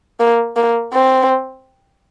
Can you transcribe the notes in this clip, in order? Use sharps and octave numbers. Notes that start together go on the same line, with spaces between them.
A#3
A#3
C4